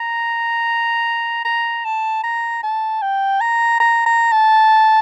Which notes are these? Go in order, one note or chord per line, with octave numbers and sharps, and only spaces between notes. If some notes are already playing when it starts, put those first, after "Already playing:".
Already playing: A#5
A#5
A5
A#5
A5
G5
A#5
A#5
A#5
A5